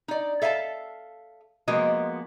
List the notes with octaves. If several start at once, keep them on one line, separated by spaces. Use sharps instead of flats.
D#4 D5
A4 E5 F5 G#5 A5
F3 G#3 A#3 B3 F#4 D#5